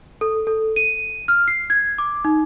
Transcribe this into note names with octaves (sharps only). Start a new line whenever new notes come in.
A4
A4
D#7
F6
C7
G#6
D6
D#4